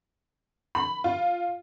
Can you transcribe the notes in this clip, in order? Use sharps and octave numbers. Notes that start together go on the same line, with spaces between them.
B5
F4